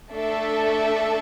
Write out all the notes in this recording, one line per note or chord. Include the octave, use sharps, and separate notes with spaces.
A3 D4 A4 E5